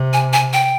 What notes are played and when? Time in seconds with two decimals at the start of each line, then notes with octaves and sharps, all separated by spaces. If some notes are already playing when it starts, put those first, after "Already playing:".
Already playing: C3
0.13 G#5
0.33 G#5
0.53 G5